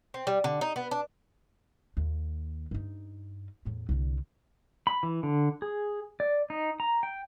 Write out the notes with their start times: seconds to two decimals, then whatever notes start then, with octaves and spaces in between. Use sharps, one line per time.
0.14 C4
0.27 G3
0.44 D3
0.61 D#4
0.76 B3
0.91 D4
1.97 D#2
2.71 G2 D#4
3.65 E2 A2
3.89 C2 D3
4.87 B5
5.03 E3
5.23 D3
5.62 G#4
6.20 D5
6.50 D#4
6.80 A#5
7.03 G5